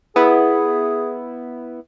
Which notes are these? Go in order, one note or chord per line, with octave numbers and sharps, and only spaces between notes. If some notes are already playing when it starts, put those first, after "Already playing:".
B3 E4 G#4